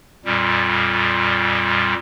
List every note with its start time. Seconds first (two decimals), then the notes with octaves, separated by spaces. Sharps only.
0.25 F2 A#2 G3